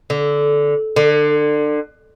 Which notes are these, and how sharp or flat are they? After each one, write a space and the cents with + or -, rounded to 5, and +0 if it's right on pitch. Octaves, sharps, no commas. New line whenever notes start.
D3 -15
D3 +25